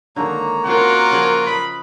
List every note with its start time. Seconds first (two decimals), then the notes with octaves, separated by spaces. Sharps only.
0.16 D3 D#3 G#3 A#3 C#5 A#5
0.66 C#3 C4 F4 F#4 A#4 F#5
1.11 C#3 F3 G#4
1.47 B4 D#5 B5